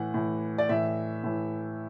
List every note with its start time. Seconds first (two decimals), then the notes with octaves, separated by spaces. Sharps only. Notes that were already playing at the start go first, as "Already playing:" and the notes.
Already playing: A2 E3 F#5
0.14 A2 E3
0.58 D5
0.69 A2 E3 E5
1.24 A2 E3